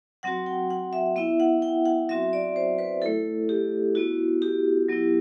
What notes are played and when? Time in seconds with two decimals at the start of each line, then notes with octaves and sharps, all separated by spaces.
0.23 F#3 C4 F#4 F#5
0.46 G5
0.70 F#5
0.93 E5
1.16 B3 E4 E5
1.40 F#5
1.62 G5
1.85 F#5
2.09 F#3 C4 F#4 E5
2.33 D5
2.56 C5
2.78 B4
3.02 A3 E4 A4
3.49 G4
3.95 B3 E4 F#4
4.42 G4
4.88 F#3 B3 E4